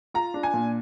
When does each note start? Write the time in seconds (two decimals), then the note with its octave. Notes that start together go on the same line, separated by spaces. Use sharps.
0.14 F4 A#5
0.34 D4
0.43 G#5
0.54 A#2